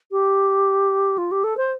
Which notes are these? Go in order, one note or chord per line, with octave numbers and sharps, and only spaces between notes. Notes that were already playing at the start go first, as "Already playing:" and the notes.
G4
F4
G4
A4
C5